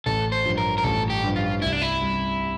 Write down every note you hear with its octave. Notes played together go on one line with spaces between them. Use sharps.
A1 A4
C5
G2 F3
A#4
A#4
A1 A4
G4
G2 F3
F4
C2 E4
D4
E4
C3 G3